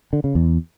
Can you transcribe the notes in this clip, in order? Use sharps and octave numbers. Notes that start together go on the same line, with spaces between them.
D3
C#3
E2